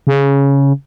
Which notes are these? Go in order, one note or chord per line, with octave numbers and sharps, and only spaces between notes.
C#3